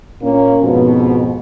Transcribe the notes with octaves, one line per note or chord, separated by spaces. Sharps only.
A#2 A#3 C#4
F2 G#2 B2